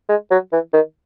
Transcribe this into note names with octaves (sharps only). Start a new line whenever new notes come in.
G#3
F#3
E3
D#3